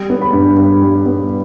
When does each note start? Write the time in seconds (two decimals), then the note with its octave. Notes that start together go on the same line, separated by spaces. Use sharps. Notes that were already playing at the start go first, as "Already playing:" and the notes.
Already playing: G3
0.10 B3
0.22 B5
0.33 G2
0.57 G2
0.82 G3
1.06 B3